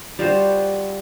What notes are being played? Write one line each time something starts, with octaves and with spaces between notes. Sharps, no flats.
G3 F4 F#4 C5